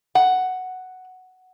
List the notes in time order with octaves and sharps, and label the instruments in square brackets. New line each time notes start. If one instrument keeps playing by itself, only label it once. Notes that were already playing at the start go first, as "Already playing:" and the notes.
[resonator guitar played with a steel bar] F#5